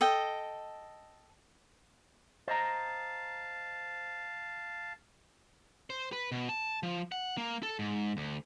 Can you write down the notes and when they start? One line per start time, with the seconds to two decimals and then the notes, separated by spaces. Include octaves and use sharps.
0.01 A4 D#5 G5
2.48 C5 D#5 F5 A5 A#5
5.90 C5
6.12 B4
6.32 B2
6.49 A5
6.83 F3
7.12 F#5
7.37 A#3
7.63 A4
7.79 G#2
8.17 D2